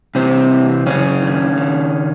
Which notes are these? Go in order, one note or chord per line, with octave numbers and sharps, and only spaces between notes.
C3 E3 C4
E3
F#2 C#3 C#4
D#3
D#3